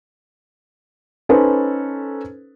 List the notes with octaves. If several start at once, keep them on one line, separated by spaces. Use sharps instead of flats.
C#4 D#4 A4 B4 C5